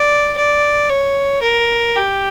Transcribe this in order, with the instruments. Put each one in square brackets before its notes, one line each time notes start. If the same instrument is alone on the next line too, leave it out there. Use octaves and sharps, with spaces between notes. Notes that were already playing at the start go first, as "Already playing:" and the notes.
Already playing: [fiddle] D5
D5
C#5
A#4
G4